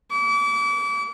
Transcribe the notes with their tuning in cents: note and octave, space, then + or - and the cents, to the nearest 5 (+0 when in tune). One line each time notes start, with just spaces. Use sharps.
D6 -35